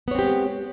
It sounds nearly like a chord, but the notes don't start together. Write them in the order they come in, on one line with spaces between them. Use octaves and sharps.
B3 C#5 C4 G4 G#3